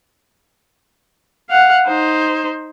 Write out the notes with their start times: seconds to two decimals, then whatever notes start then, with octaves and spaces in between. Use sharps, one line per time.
1.50 F5 F#5
1.87 D#4 C5